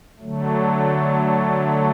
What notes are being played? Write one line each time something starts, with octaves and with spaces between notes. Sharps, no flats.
D3 F#3 A3